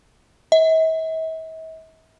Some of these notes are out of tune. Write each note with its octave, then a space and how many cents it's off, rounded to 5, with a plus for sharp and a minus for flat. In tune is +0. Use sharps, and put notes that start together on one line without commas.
E5 -45